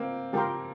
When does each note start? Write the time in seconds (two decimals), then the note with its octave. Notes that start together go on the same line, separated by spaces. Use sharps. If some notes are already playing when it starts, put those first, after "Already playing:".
Already playing: A#3 C4
0.33 F3 G4 A#4 G5 C6